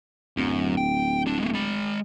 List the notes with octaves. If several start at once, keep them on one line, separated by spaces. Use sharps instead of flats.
D1 F#2
G5
G3 D4
G#3 A#3
G#3 B5